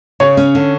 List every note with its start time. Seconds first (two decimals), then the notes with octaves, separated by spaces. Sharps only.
0.20 C#3 C#5
0.37 C#4
0.55 D3